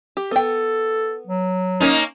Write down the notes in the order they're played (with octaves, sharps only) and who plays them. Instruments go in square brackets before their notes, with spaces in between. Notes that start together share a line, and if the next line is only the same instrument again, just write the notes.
[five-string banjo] G4
[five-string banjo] B3 G5 [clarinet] A4
[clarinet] F#3
[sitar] A#3 C#4 D#4